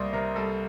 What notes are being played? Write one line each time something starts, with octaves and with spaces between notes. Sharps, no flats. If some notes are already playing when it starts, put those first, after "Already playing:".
Already playing: C2 G3 A#3 D5 D#5
C3 A#4
G3 A4